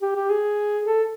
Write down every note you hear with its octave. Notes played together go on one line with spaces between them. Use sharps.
G4
G4
G#4
A4